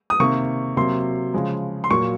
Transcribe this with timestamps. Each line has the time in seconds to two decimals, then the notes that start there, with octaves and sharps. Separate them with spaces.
0.10 D#6
0.20 C3 D#3 A#3 C#6
0.77 C3 F#3 A#3 C6
1.34 C#3 F3 G#3
1.84 C6
1.91 A#2 F#3 A#3 C#6